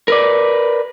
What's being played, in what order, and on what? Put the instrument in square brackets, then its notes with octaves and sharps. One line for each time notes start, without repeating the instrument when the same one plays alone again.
[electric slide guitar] A#4 B4 D5